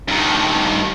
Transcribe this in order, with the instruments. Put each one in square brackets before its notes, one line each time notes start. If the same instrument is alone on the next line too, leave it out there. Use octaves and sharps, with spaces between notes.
[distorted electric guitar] G2 D#3